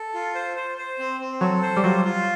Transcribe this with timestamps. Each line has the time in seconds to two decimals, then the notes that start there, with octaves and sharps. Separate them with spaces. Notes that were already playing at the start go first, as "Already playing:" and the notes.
Already playing: A4
0.14 F4
0.35 C5
0.56 C5
0.78 C5
0.99 C4
1.20 C4
1.41 F#3 A4
1.62 C5
1.77 G3
1.83 F#3 F4
2.05 F4